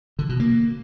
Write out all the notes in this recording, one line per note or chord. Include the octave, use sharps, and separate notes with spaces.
D3
B2
A#3